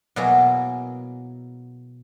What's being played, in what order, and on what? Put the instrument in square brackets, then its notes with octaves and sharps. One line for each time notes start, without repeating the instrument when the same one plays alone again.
[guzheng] B2 F#3 A#3 E4 G#4